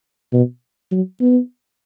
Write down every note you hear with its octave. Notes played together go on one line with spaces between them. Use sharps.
B2
F#3
B3